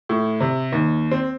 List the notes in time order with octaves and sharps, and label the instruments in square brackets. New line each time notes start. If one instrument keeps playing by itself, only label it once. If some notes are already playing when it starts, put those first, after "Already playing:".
[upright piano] A2
C3
D#2
C4